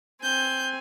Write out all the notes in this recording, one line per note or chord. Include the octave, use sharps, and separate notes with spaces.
C4 G#5 G6